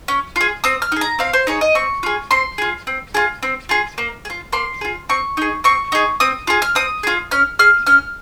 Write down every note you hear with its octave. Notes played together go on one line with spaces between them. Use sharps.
C#4
F4 G#4
C4 D#6
F6
D#4 G#4
A#5
C4 F5
C5
D#4 G#4 C#5
D#5
C4 C#6
F4 G#4
C4 C6
F4 G#4
C4
F4 G#4
C4
F4 G#4
A#3
G#4
F4
A#3 C6
F4 G#4
C4 C#6
D#4 G#4
C4 C#6
D#4 G#4
C4 D#6
F4 G#4
F6
C4 D#6
F4 G#4
C#4 F6
G#4 F6
C#4 F6